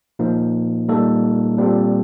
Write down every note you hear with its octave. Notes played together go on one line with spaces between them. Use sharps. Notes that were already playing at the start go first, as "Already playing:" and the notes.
A#2 F3 A#3 D#4
A#2 G3 A#3 D#4 A4
A#2 G3 C4 F4 A4